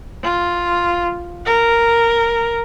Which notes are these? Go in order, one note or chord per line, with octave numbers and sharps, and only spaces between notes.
F4
A#4